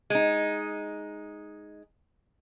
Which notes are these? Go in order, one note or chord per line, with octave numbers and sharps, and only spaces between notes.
G#3 D#4